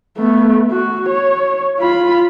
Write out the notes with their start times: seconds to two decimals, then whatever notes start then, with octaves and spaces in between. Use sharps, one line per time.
0.17 A3 B3
0.72 F#4
1.09 C#5
1.80 F4 B5